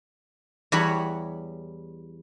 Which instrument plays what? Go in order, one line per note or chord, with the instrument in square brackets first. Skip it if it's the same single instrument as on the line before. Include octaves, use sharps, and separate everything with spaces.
[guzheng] E2 G3 F#4 C#5 B5